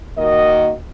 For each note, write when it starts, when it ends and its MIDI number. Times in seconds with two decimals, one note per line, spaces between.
0.17 0.72 51
0.17 0.72 58
0.17 0.72 66
0.17 0.72 75